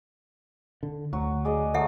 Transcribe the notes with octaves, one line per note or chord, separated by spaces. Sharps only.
D3
D2 F#3 F#4
G#4 D5 D#5
F#3 A3 A4 E5 F#5